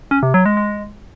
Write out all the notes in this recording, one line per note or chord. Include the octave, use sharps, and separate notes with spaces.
C#4
C3
F#3
G#3
G#3